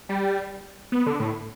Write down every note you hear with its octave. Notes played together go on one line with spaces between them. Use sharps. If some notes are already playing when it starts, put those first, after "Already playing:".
G3
B3
D3
A2